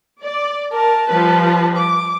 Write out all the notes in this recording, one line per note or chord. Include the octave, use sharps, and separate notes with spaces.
D5
A#4 A5
F3 G3 B4
D6